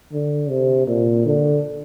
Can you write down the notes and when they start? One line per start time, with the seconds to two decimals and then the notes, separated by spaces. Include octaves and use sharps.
0.12 D3
0.49 C3
0.87 A#2
1.26 D3